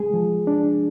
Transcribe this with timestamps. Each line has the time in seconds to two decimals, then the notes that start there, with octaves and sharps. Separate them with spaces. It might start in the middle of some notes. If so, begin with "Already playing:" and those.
Already playing: G#3 G#4
0.14 F3
0.47 D4